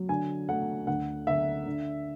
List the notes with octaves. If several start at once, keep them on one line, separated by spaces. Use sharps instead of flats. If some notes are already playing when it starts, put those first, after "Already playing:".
Already playing: F#3
D3 G#5
A3 F#5
D2 F#5
D3 E5
D3